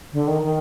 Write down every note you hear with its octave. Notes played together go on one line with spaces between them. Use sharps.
D3
D#3
D#3